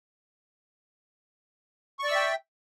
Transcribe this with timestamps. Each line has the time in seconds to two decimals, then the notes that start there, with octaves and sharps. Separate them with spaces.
2.00 C#6
2.04 D5
2.08 E6
2.12 E5
2.16 G5